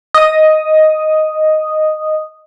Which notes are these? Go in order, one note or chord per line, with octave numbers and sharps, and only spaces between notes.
D#5 D#6